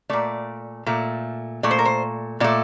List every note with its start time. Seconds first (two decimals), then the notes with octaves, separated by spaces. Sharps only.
0.10 A#2 A3 D5
0.86 A#2 A3
1.63 A#2 A3 D5
1.71 C5
1.79 A#4
1.85 C5
2.40 A#2 A3 D5